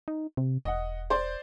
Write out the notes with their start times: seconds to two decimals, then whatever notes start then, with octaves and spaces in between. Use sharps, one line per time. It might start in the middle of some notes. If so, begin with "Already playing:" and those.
0.08 D#4
0.37 C3
0.65 E1 D#5 F#5
1.10 C5 D5 C6